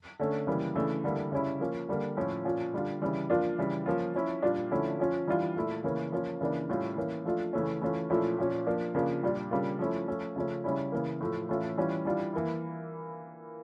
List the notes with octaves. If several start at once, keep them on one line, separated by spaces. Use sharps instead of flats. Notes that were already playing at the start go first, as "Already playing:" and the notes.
D3 A3 C#4
C#3 E3 G3 A#3
C#3 E3 A3 D4
D3 G3 A#3 E4
C#3 G3 C#4 E4
F3 A#3 C#4
D3 G3 A#3
A2 F3 C#4 F4
A#2 F3 C#4 F4
D3 G3 D4 F4
C#3 E3 G3
F3 A#3 D4 F4
C#3 E3 G3
F3 A#3 C#4 F4
F3 C#4 E4
A#2 G3 D4 F4
D3 F3 A3 C#4 E4
F3 C#4 F4
E3 G3 D4 F4
A#2 A3 E4
C#3 E3 A#3 C#4
F3 A#3 C#4 F4
C#3 E3 A#3 D4
A2 G3 C#4 F4
E3 A#3 C#4
F3 A3 D4 F4
C#3 E3 A3 C#4
E3 A3 C#4 F4
A#2 F3 A3 C#4 E4
A#2 F3 C#4
F3 A#3 D4
C#3 F3 A#3 D4
A#2 G3 D4 F4
C#3 G3 A#3 D4 F4
F3 A3 C#4 E4
F3 A3 C#4
C#3 F3 A3 C#4
C#3 G3 C#4 E4
C#3 E3 A#3
A2 F3 A3
A2 E3 A3 C#4 F4
E3 G3 C#4 F4
E3 G3 D4 F4
E3 A#3 E4